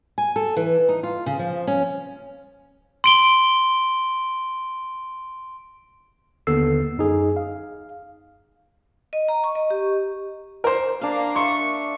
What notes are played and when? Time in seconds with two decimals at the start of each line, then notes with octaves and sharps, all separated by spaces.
0.18 G#5
0.36 A4
0.57 E3
0.89 D#4
1.03 F4
1.26 C#3
1.39 F3
1.67 C#4
3.04 C6 D7 G7
6.47 D#2 D3 B3 A4 E6 C7
6.98 F#2 D#4 G#4
7.37 F5
9.13 D#5
9.28 A#5
9.44 C#6
9.55 D#5
9.70 G4
10.64 A#4 C5
11.01 A#3 D4 F5
11.35 E5 C6 C#6